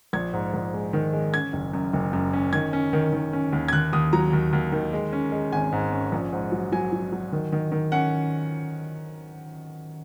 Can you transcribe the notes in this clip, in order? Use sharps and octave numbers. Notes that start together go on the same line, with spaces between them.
A#1 G#6
G#2
A#1
G#3
D#3
G#3
C#4 G#6
F#1
F#2
F#1
F#2
C#4
D#3 G#6
C#4
D#3
D#3
C#4
D#2
G#6
D#2 F#6
D#2 D#6
F#3 A#5
D#2
D#2
D#3
G#3
C#4
G#3
G#1 G#5
G#2
C#4
A#1
G#2
F#3
F#3 G#5
F#3
F#3
D#3
D#3
D#3
C#4 F#5